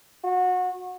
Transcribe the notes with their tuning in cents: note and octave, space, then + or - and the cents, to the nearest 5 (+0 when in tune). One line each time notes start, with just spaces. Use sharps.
F#4 -25